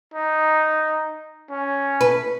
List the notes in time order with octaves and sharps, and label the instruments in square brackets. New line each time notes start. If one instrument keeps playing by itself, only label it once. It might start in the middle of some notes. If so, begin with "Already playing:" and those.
[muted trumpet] D#4
C#4
[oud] B4